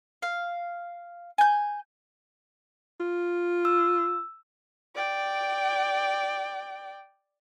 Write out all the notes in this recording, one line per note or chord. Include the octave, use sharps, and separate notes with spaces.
F5
G#5 G6
F4
E6
D5 G5